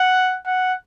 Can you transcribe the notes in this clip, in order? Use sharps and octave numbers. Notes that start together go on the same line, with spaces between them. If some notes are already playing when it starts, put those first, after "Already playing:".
Already playing: F#5
F#5